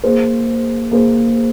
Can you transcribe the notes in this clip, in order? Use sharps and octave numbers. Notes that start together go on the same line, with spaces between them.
A#3 G#4 C5
A#3 G#4 C5